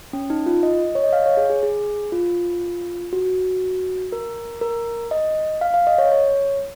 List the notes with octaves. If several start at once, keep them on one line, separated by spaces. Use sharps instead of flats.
C#4
D#4
F4
D#5
C#5
D#5
F5
C#5
G#4
G#4
G#4
F4
F#4
A#4
A#4
D#5
F5
F5
D#5
C#5
C#5